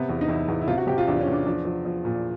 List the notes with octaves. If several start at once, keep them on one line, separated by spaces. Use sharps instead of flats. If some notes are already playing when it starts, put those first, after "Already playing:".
Already playing: C3 B3
E2
D#4
E2 E4
E2
E4
C3 F4
F#4
C3 G4
F4
E2 D4
C#4
E2
D4
F3 D4
F3
F3
A#2